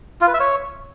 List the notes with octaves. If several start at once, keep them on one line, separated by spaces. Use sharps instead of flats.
F4
B4
E5
C#5